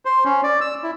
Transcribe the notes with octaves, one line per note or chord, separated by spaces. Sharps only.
C5
C#4
D5
E6
E4